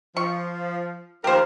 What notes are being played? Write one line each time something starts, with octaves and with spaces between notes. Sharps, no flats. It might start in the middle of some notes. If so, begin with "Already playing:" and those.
F3 C#6
D#2 F3 G4 A#4 C5